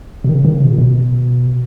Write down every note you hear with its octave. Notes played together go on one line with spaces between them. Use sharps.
B2
D#3
C#3
D#3
C#3
B2
A#2
B2